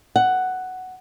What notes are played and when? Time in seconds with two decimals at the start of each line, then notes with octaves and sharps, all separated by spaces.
0.16 F#5